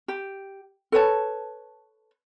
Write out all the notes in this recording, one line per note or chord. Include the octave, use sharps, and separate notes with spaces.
G4
A4 B4 C#5 A5